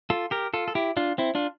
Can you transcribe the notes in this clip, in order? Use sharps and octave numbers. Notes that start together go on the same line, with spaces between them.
F4 A4
G4 A#4
F4 A4
A4
E4 G4
D4 F4
C4 E4
D4 F4